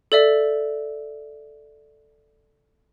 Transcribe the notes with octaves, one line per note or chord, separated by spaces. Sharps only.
A4 D5 E5